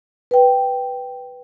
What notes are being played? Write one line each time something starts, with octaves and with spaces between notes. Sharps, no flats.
B4 G5